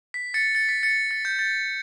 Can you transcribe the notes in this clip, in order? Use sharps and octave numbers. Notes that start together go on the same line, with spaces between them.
B6
A6 C#7
A6 C#7
B6
A6 C#7
A6
G6
A6